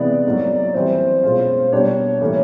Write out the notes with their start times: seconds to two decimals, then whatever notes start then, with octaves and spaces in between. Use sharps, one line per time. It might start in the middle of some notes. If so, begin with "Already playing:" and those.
Already playing: C3 E3 G#3 B3 E4 D5
0.26 F#3 A#3 D#4
0.74 E3 G3 C4 E4 C5
1.23 B2 G#3 C#4 F4
1.72 B2 G3 A#3 D4 C#5
2.20 A2 E3 G3 A#3 C#4